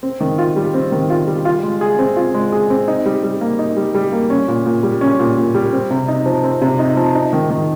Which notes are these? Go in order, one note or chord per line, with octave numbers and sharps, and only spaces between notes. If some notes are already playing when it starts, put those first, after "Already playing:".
C4
D#3
F4
G3
C4
D#3
F4
G3
F4
G#3
G#4
C4
F4
G#3
G#4
C4
D#4
G3
G3
A#3
D#4
G3
G3
A#3
C#4
A#2
A#2
G3
C#4
A#2
A#2
G3
C4
C3
D#4
F3
C4
C3
D#4
F3
D#4
D#3
D#3